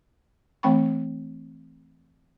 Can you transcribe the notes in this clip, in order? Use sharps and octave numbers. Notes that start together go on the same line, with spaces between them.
E3 A3 C4 G5 B5 C#6